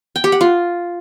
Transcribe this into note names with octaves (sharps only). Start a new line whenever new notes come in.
G5
G4
F#5
F4